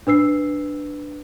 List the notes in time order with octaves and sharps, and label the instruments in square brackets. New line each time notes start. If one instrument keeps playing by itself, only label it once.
[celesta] D4 B4 E6 C7